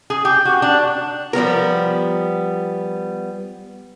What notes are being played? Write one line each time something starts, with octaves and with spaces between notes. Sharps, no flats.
G#4
G4
F#4
D4
F3 G3 B3 A#4